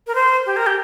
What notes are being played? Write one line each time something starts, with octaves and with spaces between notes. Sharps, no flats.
A#4
C5
G4
A#4
G4